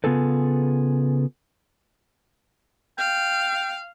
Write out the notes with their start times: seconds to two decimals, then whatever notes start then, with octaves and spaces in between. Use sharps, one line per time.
0.04 C#3 B3 F4 G#4 A4 B4
2.99 F5 G5